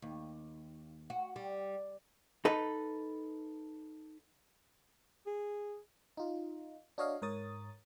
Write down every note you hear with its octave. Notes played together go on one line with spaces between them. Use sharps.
D#2
F#4
G3
D#4 A4 B4
G#4
D#4 F4
D4 F#4 C#5 D#5 F5
G#2 A#4 C#5 D#6 A6